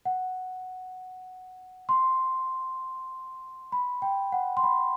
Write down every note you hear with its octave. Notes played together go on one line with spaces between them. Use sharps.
F#5
C6
B5
G5
F#5
C6
B5